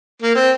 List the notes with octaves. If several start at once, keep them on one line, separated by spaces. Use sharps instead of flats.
A#3
C4